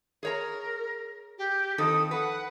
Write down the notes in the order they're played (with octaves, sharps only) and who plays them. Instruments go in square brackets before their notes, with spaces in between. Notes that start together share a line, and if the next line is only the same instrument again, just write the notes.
[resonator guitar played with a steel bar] G#4 C#5 A#5 [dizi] A#4
[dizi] G4
[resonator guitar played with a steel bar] F2 D#3 A4 [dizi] D#6
[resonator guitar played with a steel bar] B4 [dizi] F#5